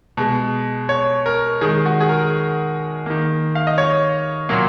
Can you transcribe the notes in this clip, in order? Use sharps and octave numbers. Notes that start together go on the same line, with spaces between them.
B2 G#3
C#5
A#4
D#3 G#3 G#4
F#4
G#4
A#4
D#3 A#3
F5
D#5
C#5
A#2 F#3 A#3